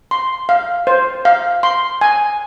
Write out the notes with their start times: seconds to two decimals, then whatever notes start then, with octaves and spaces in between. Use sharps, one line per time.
0.11 C6
0.49 F5
0.87 C5
1.25 F5
1.63 C6
2.01 G#5